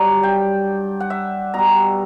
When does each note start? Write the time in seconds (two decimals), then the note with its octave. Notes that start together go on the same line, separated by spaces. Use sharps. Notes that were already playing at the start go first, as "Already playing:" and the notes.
Already playing: G2 F#3 D5
0.23 G5
1.00 F#5
1.10 E5
1.54 B2 G3 A#5